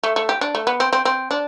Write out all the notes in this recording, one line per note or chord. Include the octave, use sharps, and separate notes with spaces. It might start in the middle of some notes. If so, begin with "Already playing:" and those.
A3
A3
G4
D4
A3
B3
C4
C4
C4
D4